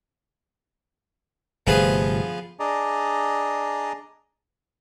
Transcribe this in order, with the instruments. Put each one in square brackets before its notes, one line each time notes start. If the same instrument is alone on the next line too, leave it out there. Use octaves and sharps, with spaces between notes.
[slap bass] G1 C3 A3 [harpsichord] F3 B3 G#4
[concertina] D4 G#4 D5 D#5 A#5